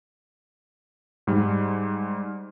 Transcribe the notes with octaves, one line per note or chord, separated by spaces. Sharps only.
G#2 G3